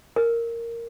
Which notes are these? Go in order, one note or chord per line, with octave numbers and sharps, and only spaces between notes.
A#4